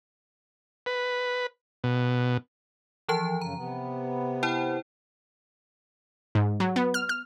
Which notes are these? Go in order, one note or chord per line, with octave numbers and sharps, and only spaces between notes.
B4
B2
E3 F3 A5
F#2 C#3 A#5
C3 B3
E4 C5 G5
G#2
F#3
B3
F6
F6